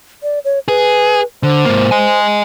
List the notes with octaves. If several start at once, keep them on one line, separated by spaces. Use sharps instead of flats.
D5
C#5
G#4 B4
D3 C5
G#2 A#3
D#5 G#5